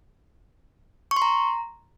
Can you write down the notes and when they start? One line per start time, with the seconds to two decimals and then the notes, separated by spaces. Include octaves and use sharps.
1.11 C#6
1.16 C6
1.22 A#5